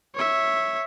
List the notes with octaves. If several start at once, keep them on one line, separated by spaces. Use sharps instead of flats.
C#5 E5